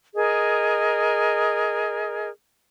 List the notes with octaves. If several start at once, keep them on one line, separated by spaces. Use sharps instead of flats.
G#4 A#4 D#5